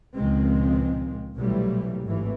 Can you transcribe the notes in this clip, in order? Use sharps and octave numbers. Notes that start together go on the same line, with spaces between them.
C#2 A#2 D#3 F3 G#3 C4
B1 A#2 E3 F#3 G3 A3
G#1 D#2 A2 E3